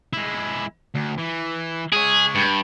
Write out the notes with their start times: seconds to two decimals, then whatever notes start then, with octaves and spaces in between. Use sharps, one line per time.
0.13 G#3 E4
0.95 D2
1.18 E3
1.92 G#3 G#4 C#5
2.35 G2